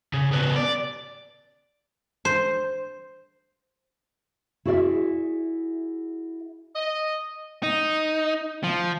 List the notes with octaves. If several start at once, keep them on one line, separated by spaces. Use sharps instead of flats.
C#3
C#3 B3
D5
C5
E4 F#4 G#4 D5 E5
D#5
D#4
F3